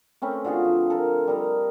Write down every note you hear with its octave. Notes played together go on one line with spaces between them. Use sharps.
A3 C4 C#4 B4
D3 F4 F#4 G#4
F3
A4 A#4
G3 A#4 D#5